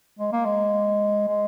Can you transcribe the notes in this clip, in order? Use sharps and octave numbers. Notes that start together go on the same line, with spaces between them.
G#3
A#3
G#3
G#3